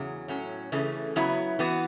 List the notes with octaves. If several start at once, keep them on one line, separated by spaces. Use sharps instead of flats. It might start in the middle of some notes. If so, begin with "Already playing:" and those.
Already playing: E2 C#3 F#3
A2 F#3 C#4
C#3 E3 A3
C#3 F#3 B3 E4
E3 B3 F#4